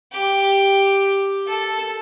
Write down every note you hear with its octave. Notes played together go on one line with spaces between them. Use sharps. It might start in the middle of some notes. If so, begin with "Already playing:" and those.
G4
A4